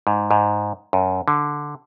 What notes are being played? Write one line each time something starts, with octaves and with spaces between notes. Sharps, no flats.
G#2
G#2
F#2
D3